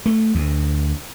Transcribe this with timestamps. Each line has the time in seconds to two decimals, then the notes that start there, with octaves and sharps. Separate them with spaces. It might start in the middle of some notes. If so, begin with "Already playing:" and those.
0.06 A3
0.35 D2